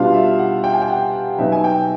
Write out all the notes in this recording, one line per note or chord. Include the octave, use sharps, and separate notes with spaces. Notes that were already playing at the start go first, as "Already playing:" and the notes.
Already playing: B2 G3 B3 D4 F4 F5
E5
F#5
G5
G#5
G5
F#5
B2 F#3 B3 D#4 E5
G#5
G5